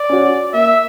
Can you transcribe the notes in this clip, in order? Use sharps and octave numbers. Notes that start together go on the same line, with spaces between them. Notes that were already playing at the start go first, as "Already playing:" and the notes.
Already playing: D5
C#4 F#4
A#3 E5